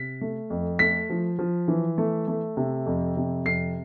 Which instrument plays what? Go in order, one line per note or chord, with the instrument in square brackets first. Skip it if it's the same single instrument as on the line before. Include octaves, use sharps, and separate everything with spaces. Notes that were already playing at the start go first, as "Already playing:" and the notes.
Already playing: [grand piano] C3 B6
A3
F2
A3 B6
F3
F3
E3
A3
A3
C3
F2
C3
F2 C7